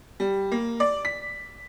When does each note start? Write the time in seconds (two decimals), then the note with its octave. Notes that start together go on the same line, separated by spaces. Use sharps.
0.20 G3
0.52 A#3
0.80 D5
1.05 B6